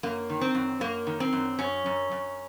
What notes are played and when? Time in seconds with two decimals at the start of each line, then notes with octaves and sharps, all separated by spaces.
0.03 F#2 A#3
0.30 D#3
0.41 C4
0.55 F#2
0.81 F#2 A#3
1.07 D#3
1.20 C4
1.33 F#2
1.59 F#2 C#4
1.86 F#2
2.12 F#2